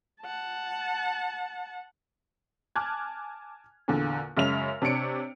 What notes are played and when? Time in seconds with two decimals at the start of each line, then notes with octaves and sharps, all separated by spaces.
0.21 F#5 A5
2.76 G#5 A5 D6 F6 F#6 G#6
3.88 E2 A#2 D3 A#3
4.37 F#2 C#3 G#3 E5 F6 F7
4.82 C3 D4 C#5 C#7 D7